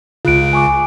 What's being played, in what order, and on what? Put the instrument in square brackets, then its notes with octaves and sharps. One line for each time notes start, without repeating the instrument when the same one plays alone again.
[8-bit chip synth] C#2 C#3 [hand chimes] F4 F#6 D7
[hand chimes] G#5 C#6 D6